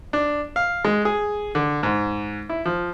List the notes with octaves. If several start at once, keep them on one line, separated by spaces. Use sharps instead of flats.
D4
F5
G#3
G#4
D3
G#2
E4
F3